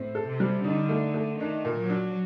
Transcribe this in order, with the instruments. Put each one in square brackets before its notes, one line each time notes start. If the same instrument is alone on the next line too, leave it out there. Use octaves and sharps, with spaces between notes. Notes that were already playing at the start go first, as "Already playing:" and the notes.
Already playing: [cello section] A2 [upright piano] C4
[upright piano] A4
[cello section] C3
[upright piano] G3
[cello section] D3 [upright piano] D#4
[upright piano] A3
A3
[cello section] D#3 [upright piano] D4
[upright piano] A#2
[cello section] F#3
[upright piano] D4